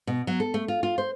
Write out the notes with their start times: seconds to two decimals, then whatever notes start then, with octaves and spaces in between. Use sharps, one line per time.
0.07 B2
0.27 F#3
0.40 A4
0.54 A3
0.68 F4
0.83 F4
0.98 C5